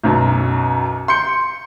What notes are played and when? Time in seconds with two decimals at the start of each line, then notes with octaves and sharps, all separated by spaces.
0.04 B1 F#2 B2
1.08 C6 G6 C#7